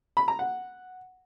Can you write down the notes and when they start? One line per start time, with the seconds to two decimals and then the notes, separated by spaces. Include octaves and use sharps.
0.17 B5
0.28 A#5
0.39 F#5